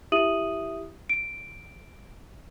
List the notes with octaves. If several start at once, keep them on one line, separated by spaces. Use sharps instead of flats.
E4 G4 E5 D#6 D#7 F#7
D7